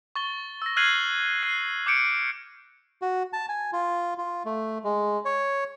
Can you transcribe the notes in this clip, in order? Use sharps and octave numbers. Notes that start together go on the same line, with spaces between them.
C#6 A6 G7
E6 A#6
F6 F#6 G#6 C7 D#7 F#7
F#6 C7 D#7
D6 G6 C#7 D7
F#4
A5
G#5
F4
F4
A3
G#3
C#5